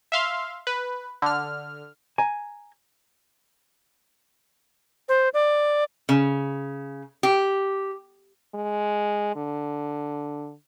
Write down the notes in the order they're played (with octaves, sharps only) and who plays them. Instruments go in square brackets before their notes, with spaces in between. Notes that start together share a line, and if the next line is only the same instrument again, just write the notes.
[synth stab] E5 F5 C6
B4
D3 F6
[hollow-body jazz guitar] G#5 A#5
[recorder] C5
D5
[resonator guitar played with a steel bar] C#3
G4
[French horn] G#3
D3